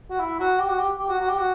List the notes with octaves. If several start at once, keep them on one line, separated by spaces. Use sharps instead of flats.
F#4
E4
F#4
G4
F#4
G4
G4
F#4
F#4
G4
F#4